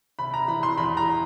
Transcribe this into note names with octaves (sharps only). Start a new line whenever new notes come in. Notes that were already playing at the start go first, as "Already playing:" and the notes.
C3 B5
A#5
E3 B5
C6
E2 B5
A#5